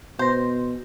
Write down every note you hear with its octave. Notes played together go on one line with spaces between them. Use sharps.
B2 C5 C6 A#6